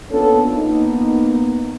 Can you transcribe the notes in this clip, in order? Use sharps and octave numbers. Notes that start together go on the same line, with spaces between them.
A#3 B3 C#4 D4 F4 A4
A#3 B3 D#4